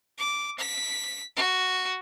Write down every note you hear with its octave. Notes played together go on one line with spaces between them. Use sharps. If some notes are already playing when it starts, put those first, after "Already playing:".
D6
B6
F#4